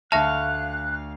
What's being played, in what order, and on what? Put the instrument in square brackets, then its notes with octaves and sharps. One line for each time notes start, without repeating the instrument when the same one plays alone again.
[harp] D2 A3 C#6 [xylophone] E5 A5 [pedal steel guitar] F5 [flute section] F#6